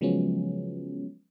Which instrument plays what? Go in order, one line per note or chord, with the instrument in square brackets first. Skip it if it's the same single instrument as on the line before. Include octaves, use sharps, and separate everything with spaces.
[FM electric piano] C#3 F3 F#3 G#3 B3 C#4